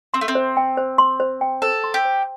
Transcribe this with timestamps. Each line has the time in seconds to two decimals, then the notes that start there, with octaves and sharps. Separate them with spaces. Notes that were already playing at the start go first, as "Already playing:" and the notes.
0.14 C4 C6
0.21 A3
0.28 C4
0.35 C5
0.57 G5
0.77 C5
0.98 C6
1.20 C5
1.41 G5
1.62 A4 C5
1.84 C6
1.94 G4
2.05 C5